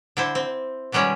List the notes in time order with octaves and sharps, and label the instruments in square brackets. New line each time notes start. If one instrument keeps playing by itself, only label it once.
[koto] D3 E4 C5
C4
B2 D#3 G3 G#3 C#4